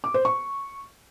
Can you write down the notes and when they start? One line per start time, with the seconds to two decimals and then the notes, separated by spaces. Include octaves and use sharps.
0.04 D6
0.14 C5
0.25 C#6